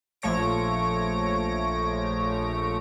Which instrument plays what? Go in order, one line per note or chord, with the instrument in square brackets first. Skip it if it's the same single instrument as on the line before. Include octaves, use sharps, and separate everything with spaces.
[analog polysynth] A#1 F3 A3 C#5 A#6 D7